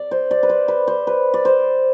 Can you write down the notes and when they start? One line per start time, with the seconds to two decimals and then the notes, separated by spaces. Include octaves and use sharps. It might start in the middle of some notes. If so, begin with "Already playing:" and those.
Already playing: D5
0.11 C5
0.31 D5
0.43 B4
0.49 C5
0.68 B4
0.87 C5
1.07 B4
1.34 D5
1.45 C5